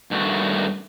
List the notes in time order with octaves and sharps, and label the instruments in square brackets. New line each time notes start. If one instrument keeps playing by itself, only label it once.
[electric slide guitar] G2 D#3 A3 F#4